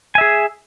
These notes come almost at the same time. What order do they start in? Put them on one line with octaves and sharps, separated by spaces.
G#5 E5 G#4